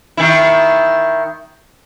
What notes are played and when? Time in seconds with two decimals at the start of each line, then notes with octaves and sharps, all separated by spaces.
0.17 D#3 E4